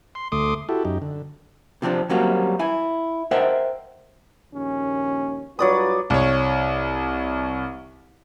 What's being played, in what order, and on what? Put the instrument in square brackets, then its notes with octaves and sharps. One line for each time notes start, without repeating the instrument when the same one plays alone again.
[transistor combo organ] C6
D2 A3 C6 D6 D#6
E4 F#4 G4 A4
F#2 D#4 G4
D3
[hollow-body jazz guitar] C3 F3 C4 D4
F#3 G3 A#3 C4 C#4 F#4
E4 G#5
A#4 C5 D#5 E5 F#5 G5
[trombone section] A#1 D#2 C#4
[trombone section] G2 F4 B4 [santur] F#3 D5 D#6
[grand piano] C2 C#5